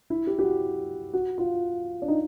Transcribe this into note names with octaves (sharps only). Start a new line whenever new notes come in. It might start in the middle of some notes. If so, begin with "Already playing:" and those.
E4
G4
G4
F#4
F#4
F4
D4
D#4